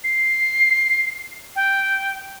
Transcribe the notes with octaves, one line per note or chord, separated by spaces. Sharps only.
C7
G5